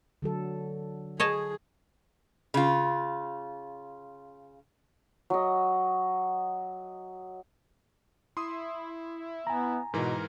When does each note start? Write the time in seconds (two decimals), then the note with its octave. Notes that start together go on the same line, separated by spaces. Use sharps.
0.22 D3 F#3 A4
1.20 G#4 C#5 D#5 A5
2.54 C#3 F4
5.30 F#3 D#5
8.37 E4 C6 D#6
9.47 B3 G#5 A#5
9.94 G#2 B2 E3 A#4